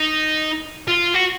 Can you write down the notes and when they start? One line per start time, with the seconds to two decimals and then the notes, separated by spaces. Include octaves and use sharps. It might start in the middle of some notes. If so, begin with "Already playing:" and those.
Already playing: D#4
0.88 F4
1.14 F#4